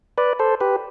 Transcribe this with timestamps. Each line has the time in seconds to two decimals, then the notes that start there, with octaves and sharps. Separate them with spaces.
0.18 B4 D5
0.39 A4 C5
0.61 G4 B4